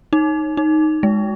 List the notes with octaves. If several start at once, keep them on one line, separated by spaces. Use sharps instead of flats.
D#4
D#4
G#3